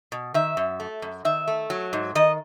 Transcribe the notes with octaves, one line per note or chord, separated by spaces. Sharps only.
B2
D#3 E5
F#2
A3
F#2
D#3 E5
A3
F#3
G#2
D#3 D#5